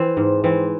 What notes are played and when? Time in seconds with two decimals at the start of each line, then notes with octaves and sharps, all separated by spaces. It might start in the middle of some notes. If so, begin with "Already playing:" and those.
Already playing: E3 C4
0.17 G#2
0.44 E3 C4